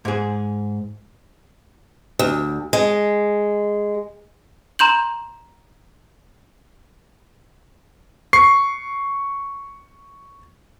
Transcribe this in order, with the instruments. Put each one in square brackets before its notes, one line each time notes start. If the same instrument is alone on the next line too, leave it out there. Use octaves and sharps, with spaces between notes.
[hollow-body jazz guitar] G#2 G#4
[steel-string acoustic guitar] D2
G#3
[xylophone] A#5 C6 G6 F#7
[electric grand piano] C#6 C7